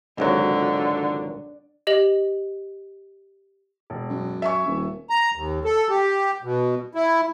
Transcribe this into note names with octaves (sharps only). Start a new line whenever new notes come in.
G#1 C#2 D3 F#3
G4 D#5 F#7
E1
F#2
E5 G#5 C#6
D#1
A#5
D#2
A4
G4
B2
E4